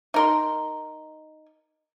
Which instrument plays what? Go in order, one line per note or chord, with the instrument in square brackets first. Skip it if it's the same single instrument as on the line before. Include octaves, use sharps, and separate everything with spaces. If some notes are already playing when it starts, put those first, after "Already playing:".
[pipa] D#4 A#4 C6